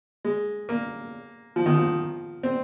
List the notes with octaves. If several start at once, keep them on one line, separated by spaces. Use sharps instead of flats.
G#3
A#3
F3
D#3
F3
C4